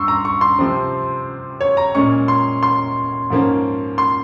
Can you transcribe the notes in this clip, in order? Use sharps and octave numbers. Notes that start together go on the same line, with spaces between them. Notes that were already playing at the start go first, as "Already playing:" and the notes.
Already playing: G2 C6 C#6 E6
A#5
C#6
C6
C3 F3 C4
C#5
A#5
A#2 G#3 C#4 C#6
C6
C6
G#2 F3 A#3 C#4
C6